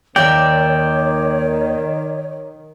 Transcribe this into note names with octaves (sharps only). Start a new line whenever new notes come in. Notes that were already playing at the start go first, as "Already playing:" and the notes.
D#2 D#3 A#4 C#5 D5 E5 G5